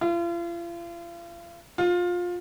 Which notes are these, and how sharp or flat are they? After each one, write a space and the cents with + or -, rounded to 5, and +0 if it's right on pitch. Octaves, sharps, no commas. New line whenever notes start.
F4 -40
F4 +20